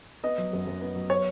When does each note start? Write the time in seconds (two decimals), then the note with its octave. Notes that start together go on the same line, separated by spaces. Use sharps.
0.23 B3 D#5
0.38 F#3
0.53 F#2
0.67 F#2
0.81 B3
0.95 F#3
1.10 B3 C#5